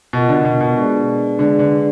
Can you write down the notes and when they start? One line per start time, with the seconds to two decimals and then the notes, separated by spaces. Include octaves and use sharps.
0.13 B2 F4 A#4 D#5 F#5
0.29 D3
0.45 B2
0.61 B2
0.76 G#3 D4 G#4 B4 D5
1.38 D3 G#3 D4 G#4 B4 D5
1.59 D3